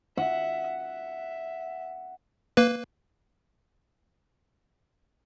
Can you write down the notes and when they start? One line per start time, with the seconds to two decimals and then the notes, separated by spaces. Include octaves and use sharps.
0.17 E5 F#5
0.82 E5
2.57 A#3 B4